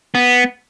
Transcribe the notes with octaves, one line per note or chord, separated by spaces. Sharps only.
B3